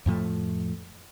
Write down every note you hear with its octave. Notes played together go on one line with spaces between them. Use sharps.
F2 A2 F3 A3